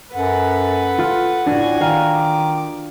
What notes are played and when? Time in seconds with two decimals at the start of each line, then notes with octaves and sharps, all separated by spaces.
0.15 F#2 A4 B4 F#5
0.99 F4
1.47 A2 D4 F#4 G#5
1.81 D#3 F5
2.15 D6